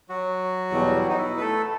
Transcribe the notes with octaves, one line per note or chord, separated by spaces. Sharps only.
F#3 F#4
E2 B2 G3
D#4
E4
B4
A3 A4